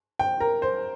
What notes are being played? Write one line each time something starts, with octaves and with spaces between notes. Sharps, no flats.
G5
A#4
C5